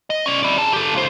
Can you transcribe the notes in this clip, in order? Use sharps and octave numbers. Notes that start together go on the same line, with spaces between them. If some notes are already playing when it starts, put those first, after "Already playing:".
D#5
C#4 D5
E4 D5
G#4 A5
G4 A4
C#2 C5